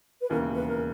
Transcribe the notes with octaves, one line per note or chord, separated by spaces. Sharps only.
B4
E1 D#2 C#3 E3 A#4
B4
A#4